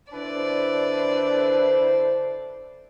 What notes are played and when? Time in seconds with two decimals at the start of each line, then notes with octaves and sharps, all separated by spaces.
0.12 D3 D4 E4 A4 B4 C5 D5